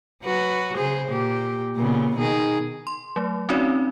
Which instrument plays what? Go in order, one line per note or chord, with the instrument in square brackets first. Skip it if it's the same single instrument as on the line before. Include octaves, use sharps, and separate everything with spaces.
[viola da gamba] F#3 F#4 B4
C#3 G#4 C5
A#2 G4
A#2 C#3 B3
B2 D#3 G#4
[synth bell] C6
F#3 A3
C4 C#4 D#4 F#4 C#5 D5